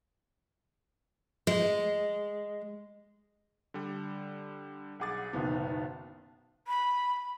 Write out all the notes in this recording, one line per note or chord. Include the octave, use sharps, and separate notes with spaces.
G#3
D3 G3
B1 G#4 F#5 D6 A6
F#1 B1 D#3 B3
B5